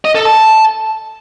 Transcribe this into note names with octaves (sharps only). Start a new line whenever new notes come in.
D#5
A4
A5